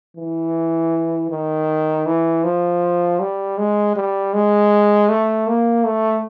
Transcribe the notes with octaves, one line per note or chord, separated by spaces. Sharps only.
E3
D#3
E3
F3
G3
G#3
G3
G#3
A3
A#3
A3